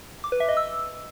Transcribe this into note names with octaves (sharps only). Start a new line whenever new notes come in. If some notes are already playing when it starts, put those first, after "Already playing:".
D6
B4
E5
D#5
E6